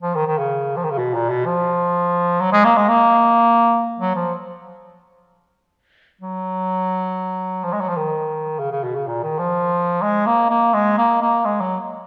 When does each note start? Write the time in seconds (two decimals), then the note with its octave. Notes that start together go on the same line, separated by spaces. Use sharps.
0.02 F3
0.15 D#3
0.26 D#3
0.38 C#3
0.77 F3
0.83 D#3
0.91 C#3
0.98 B2
1.14 A#2
1.30 B2
1.46 F3
2.40 F#3
2.52 G#3
2.64 A#3
2.76 G#3
2.88 A#3
3.99 F#3
4.16 F3
6.21 F#3
7.64 F3
7.73 G#3
7.81 F#3
7.89 F3
7.96 D#3
8.59 C#3
8.71 C#3
8.84 B2
8.95 C#3
9.07 A#2
9.23 D#3
9.39 F3
10.02 G#3
10.26 A#3
10.50 A#3
10.74 G#3
10.98 A#3
11.21 A#3
11.45 G#3
11.61 F#3